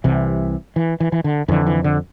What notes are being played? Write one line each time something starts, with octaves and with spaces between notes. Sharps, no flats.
C2 C3 E3
E3
E3
E3
D3
F2 D3 E3
E3
D3